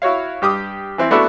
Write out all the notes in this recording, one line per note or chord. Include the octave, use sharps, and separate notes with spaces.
E4 F#4 C#5 F5
G2 G4 D6 D#6
E3 C4 E4
A3 B3 D4 E4 F#4 A4